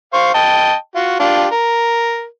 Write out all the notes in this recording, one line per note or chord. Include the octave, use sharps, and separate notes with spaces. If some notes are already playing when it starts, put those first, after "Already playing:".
C5 F5 C#6
D#5 G5 A5
F4 F#4
D4 F4 G4
A#4